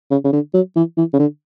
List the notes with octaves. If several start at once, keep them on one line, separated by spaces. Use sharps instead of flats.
C#3
C#3
D3
F#3
E3
E3
C#3
D3